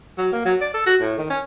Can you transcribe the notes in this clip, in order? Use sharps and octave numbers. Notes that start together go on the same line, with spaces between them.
F#3
A#3
F#3
D5
A4
F#4
A2
D#3
C#4